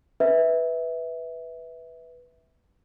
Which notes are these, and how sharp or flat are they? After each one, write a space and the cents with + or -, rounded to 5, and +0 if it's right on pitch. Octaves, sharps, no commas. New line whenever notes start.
B4 +0 E5 -15